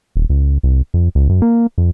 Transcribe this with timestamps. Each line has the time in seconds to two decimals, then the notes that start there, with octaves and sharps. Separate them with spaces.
0.16 D#1
0.29 C#2
0.63 C2
0.94 F2
1.15 C#2
1.29 F#2
1.42 A#3
1.78 F2